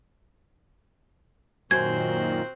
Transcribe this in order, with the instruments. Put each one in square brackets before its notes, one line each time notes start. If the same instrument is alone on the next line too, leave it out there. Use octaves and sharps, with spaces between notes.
[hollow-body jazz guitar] F#2 [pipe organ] A#2 D#3 [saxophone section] C4 F#4 C5 [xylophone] G#6